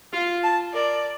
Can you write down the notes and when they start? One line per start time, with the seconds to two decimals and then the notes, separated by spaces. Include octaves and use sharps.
0.13 F4 F5
0.43 A5
0.73 A#4 D5